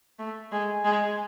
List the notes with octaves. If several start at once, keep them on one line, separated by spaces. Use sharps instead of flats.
A3
G#3
G#3